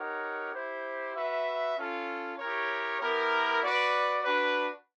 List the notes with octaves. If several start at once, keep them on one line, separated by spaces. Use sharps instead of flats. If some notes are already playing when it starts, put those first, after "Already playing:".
Already playing: D#4 G4 A#4 C#5 F#5
E4 G4 C5
F#4 B4 E5
C#4 F4 A4
E4 G4 A#4 C#5
B3 E4 G4 A#4
F#4 B4 D5
D4 F#4 B4